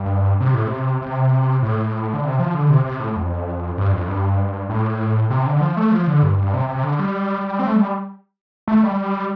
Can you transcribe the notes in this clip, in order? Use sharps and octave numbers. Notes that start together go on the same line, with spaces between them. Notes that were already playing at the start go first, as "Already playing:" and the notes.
Already playing: G2
C3
A2
C3
C3
A2
D3
C3
F3
D3
C3
C3
A2
F2
G2
F2
G2
A2
C3
D3
D3
F3
A3
F3
D3
G2
G2
C3
C3
D3
G3
C4
A3
G3
A3
G3